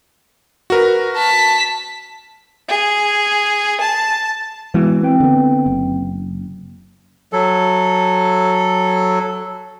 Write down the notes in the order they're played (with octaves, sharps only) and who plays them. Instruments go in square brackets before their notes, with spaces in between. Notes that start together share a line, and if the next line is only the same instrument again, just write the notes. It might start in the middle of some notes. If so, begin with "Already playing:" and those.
[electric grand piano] F#4 A#4 B4
[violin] A5 B6
[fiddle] G#4
A5
[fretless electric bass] E3 [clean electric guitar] G#3 B3 F#4
[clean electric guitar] C4 B4 G5
[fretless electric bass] D3 B3
F#1
[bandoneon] F#3 A4